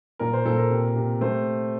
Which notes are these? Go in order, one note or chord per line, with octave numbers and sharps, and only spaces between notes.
A#2 A#4
C5
A#2 A4
A#4
C3
C3
A3 C5